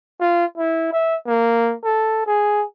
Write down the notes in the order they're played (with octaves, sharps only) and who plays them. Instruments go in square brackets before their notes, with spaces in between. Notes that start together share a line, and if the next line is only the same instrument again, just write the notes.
[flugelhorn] F4
E4
E5
A#3
A4
G#4